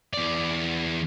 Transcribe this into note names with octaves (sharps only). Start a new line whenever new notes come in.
E2 D5